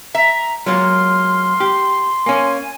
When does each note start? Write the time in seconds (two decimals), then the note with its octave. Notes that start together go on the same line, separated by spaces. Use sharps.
0.15 E5 A#5
0.66 F#3 G#3 A#3 F4 C6 F6
1.60 G4
2.26 A#3 C#4 G#5